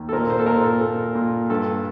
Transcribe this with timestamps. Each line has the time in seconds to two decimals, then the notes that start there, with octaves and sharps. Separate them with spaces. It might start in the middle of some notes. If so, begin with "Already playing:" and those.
Already playing: D#2
0.09 A4
0.12 A#2 A#4
0.30 C5
0.39 A4
0.46 A#2 A#4
0.64 A4
0.81 A#2 A4
1.15 A#2
1.50 G2 A4